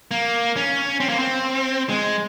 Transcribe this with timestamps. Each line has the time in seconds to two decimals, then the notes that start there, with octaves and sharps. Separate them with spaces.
0.11 A#3
0.57 C#4
1.00 C4
1.09 A#3
1.19 C4
1.89 G#3